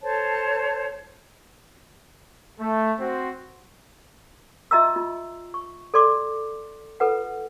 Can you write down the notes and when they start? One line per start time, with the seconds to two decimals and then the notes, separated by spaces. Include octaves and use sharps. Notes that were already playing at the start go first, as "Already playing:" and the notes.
0.02 A4 C5 C#5 A5
2.60 A3
3.00 C4 F#4 C5
4.71 F4 D#5 E5 A#5 C6 E6
4.96 F4
5.54 C#6
5.94 A4 D5 C6 D6
7.00 F4 A4 B4 F#5